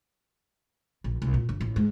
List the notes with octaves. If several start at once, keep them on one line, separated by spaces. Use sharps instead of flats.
A#1
C2
A#2
G1
A1
G#2